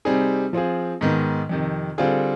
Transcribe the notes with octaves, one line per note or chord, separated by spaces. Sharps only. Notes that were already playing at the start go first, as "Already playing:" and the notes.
C3 G3 C4 D#4 G#4
F3 C4 F4 G#4
G#2 D#3 B3 D#4
F2 C3 D#3
D3 G3 C4 F4 G#4